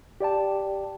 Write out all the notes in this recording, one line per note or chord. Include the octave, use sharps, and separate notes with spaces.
G4 D5 G5 A5